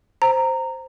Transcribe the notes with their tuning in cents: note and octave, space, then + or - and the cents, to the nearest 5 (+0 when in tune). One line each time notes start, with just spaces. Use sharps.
C5 +0 A#5 -15